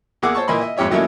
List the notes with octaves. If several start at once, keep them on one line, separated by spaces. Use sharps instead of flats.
E2 A#3 G#4 F#5 D6 E6
C5 C#5 A5 C#6
A#2 E3 A#3 D#5 B5 C6
D#5 E5
F2 G#2 G4 C#5 E5
D#3 F#3 A3 A#3 C#4 E4